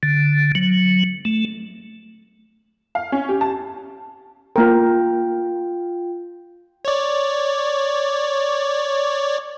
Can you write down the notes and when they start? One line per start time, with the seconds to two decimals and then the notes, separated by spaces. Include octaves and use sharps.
0.03 D3
0.55 F#3
1.25 A3
2.95 F5
3.12 C#4
3.29 G4
3.41 A5
4.56 A#3 F4 A#4 G5
6.85 C#5 D5